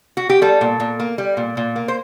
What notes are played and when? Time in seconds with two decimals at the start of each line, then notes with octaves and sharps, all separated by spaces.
0.17 F#4
0.29 G4
0.42 G3 A4
0.61 A#2
0.80 A#2
1.00 A#3
1.18 G3
1.37 A#2
1.57 A#2
1.76 A#3
1.88 C5